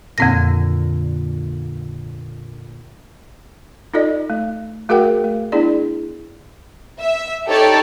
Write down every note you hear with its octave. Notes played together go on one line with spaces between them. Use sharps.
F2 A#2 D3 C4 A#6
D#4 F4 A4 D5 D#5
A3
A3 F#4 G#4 A#4 F#5 G5
A3
B3 D4 E4 G#4 D5
E5
D#4 G4 A4 C#5 D5